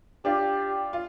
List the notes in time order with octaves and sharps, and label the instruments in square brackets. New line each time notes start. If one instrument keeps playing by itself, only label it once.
[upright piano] D4 F4 [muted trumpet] G4
[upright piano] F4